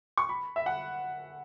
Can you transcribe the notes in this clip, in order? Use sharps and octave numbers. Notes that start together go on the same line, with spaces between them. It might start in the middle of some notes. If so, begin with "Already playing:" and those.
C#6
B5
E5
F#5